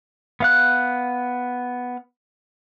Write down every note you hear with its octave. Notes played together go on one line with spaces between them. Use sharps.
B3 F5 F#6